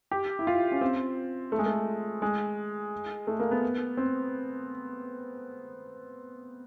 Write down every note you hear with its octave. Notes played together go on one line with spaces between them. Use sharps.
G4
E4
F4
C#4
C4
A3
G#3
A3
G#3
A3
A#3
B3
C4